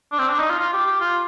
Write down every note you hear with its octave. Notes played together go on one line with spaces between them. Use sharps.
D4
C4
D4
D#4
F4
F4
G4
G4
F4